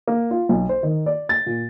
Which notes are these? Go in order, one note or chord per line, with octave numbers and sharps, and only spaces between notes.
A#3
F4
B1
C5
D#3
D5
A6
A#2